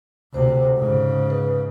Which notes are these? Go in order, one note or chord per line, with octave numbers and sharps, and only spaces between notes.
D2 C3 C5
G#2 C#3
B4